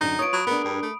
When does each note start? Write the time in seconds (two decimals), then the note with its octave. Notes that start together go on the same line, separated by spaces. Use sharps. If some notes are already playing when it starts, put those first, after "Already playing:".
0.01 F#2 D3 D#4
0.19 F4 B4 C#5 D#6 D7
0.33 F#3 B5
0.47 B3 D4 G#4 A#4
0.65 G2
0.82 A3